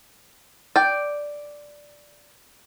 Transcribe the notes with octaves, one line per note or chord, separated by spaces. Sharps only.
D5 G5